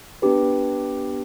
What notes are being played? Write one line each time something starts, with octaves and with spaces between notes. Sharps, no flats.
B3 D4 G4 B4